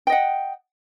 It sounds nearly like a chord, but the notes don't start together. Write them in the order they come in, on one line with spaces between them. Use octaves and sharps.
G5 D#5 F#5